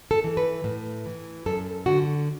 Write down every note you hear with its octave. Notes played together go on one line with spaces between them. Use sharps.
A4
E3
B4
A2
E3
F#2 A4
D3 F#4